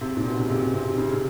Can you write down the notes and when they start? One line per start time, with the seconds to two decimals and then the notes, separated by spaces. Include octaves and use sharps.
0.01 C3
0.17 A#2
0.26 B2
0.39 C#3
0.50 C3
0.74 C3
0.98 C#3